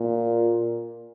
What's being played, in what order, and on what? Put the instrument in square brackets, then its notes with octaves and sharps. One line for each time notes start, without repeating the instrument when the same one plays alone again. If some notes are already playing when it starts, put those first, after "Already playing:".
Already playing: [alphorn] A#2